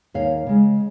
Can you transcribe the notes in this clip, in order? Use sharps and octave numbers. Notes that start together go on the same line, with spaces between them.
D#2 C#5 F5
C#3 G#3